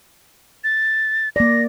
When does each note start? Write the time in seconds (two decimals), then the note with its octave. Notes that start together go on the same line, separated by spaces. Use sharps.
0.64 A6
1.36 A#3 D5 A#6